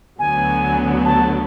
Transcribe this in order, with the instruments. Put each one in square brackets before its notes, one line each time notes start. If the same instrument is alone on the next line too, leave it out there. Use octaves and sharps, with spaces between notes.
[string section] D2 D3 F#3 B3 [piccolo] G#5
[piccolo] A5